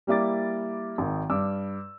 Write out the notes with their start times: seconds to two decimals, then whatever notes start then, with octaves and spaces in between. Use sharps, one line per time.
0.07 G3 A#3 E4 D6 A6
0.98 G#1 D#3
1.30 G2 D6 E6